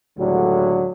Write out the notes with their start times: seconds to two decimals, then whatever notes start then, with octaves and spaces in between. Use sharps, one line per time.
0.18 C#2 A2 D3 F#3 G3